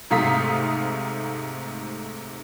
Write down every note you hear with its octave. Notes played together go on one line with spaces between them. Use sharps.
G#2 C3 A3 F5 D#6 B6